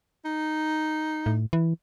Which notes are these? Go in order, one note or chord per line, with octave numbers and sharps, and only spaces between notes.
D#4
A2
E3